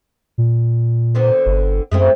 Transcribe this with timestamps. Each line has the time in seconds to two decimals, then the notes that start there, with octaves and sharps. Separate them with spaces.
0.38 A#2
1.15 D3 B3 C4
1.46 G1
1.92 F#2 G#3 A3 C4